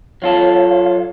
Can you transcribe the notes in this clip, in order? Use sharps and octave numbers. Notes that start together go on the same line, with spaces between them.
F#3 F4 A4 C#5 F5